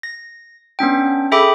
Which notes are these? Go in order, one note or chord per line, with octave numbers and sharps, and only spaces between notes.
A#6
B3 C#4 D4 G5
G#4 A4 E5 G5 B5 D6